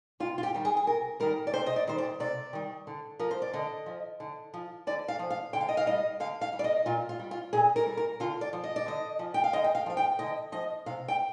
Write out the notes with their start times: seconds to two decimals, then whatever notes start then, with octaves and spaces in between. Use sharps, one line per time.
0.20 C3 F4
0.38 F4
0.43 G4
0.54 D#3 G3
0.65 G#4
0.77 G#4
0.87 C3 A#4
1.20 D#3 G3 A#4
1.47 D5
1.53 C3 C5
1.66 D#5
1.76 D5
1.87 D#3 G3 C5
1.98 D5
2.20 C3 D5
2.53 D#3 G3
2.87 D3
3.19 F3 A#4
3.31 C5
3.42 D5
3.53 D3 D#5
3.86 F3
4.20 D3
4.54 F3
4.87 D3 D5
5.08 F5
5.19 F3
5.30 F5
5.53 D3 G5
5.61 F5
5.69 D#5
5.77 F5
5.86 G3 D#5
6.20 D3 F5
6.41 F5
6.53 G3
6.59 D5
6.64 D#5
6.86 A#2 F4
7.09 F4
7.19 G3
7.31 F4
7.53 A#2 G#4
7.76 A#4
7.86 G3
7.97 A#4
8.20 D3 F4
8.41 D5
8.53 F3
8.64 D#5
8.76 D5
8.86 D3 D#5
9.19 F3
9.34 G5
9.44 F5
9.53 D3 D#5
9.64 G5
9.75 F5
9.86 F3 F5
9.97 G5
10.19 D3 D#5
10.52 F3 D#5
10.86 C3 F5
11.08 G5